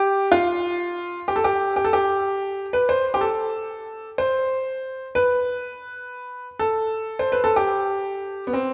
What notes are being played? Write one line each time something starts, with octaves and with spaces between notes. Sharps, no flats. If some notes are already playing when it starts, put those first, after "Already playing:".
Already playing: G4
F4
G4
A4
G4
G4
A4
G4
B4
C5
G4
A4
C5
B4
A4
C5
B4
A4
G4
B3
C4